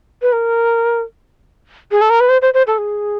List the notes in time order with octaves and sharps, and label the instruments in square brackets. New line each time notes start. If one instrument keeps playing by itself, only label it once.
[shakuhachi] B4
A#4
G#4
A4
A#4
B4
C5
C5
C5
A4
G#4